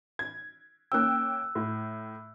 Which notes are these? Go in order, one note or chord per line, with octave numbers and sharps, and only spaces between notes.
G#6
A#3 C#4 G5 E6 F#6
A2